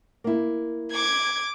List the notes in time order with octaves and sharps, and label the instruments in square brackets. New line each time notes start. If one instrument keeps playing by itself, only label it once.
[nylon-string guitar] A#3 E4
[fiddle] D6 [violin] G#6